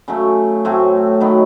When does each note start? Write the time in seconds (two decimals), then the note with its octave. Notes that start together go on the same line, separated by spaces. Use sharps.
0.08 C#3 F#3 A3
0.65 A2 F#3 A3 C4
1.21 D#3 F#3 B3